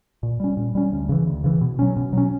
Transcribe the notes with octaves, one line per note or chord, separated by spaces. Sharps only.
A#2
G3 C#4
A#2
G3 C#4
D2
C#3 E3
D2
C#3 E3
B2
F#3 C#4
B2
F#3 C#4